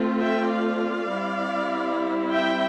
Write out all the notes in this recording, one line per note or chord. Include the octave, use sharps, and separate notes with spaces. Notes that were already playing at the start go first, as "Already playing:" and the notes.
Already playing: A3 C4 F4
E5 G5
D5 F5
G3 C4 E4
E5 G5